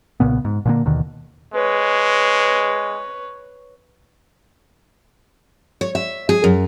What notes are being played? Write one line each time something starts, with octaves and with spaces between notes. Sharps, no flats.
B1 A#2 C#3 B3
G#2
A#2 D3 A#3
D#2 B2 D3 D#3
G#3 B4 C#5
C#5
E5
G#4
F#2